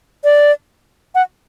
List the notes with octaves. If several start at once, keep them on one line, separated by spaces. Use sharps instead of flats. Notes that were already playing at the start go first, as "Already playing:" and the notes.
D5
F#5